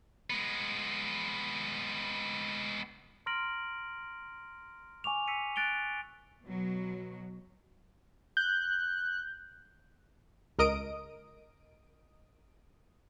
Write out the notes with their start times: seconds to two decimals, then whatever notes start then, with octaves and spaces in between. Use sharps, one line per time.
0.30 G#3 B3
3.26 A#5 C6 F6 A#6 D7 F#7
5.04 G#5 C#6 D6 F7
5.27 E6 B6 C#7 D#7
5.56 F#6 A6 D7 F7 G7
6.45 B2 F#3
8.37 F#6 G6
10.59 C#2 A#4 D#5 D#6 D7